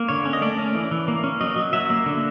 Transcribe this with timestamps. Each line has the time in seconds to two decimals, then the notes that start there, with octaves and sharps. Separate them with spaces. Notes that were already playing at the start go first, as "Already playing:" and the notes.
Already playing: A#3
0.09 D3 C#5
0.26 C#4
0.33 D#5
0.42 A3 D5
0.59 C#4
0.75 E3
0.91 E3
1.08 A#3
1.24 C#4
1.41 F#3 D#5
1.56 F#3
1.73 F#3 E5
1.90 A#3
2.06 D3